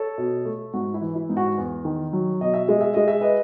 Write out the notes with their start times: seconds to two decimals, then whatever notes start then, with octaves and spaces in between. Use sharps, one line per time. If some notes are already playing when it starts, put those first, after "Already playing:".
Already playing: A4 C#5
0.18 B2
0.45 A3
0.74 G#2 F#4
0.94 E4
1.01 E3
1.15 E4
1.29 G#2
1.37 F#4
1.58 E2
1.85 D#3
2.13 F#3
2.41 B2 D#5
2.54 E5
2.68 G#3 D#5
2.81 E5
2.94 G#3 D#5
3.08 E5
3.21 B4 D#5